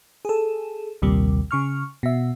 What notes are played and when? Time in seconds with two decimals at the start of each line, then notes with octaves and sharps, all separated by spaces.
0.25 G#4 A4
1.02 A#1 D#2 C3 G3
1.51 C#3 C#6 F6
2.03 B2 E5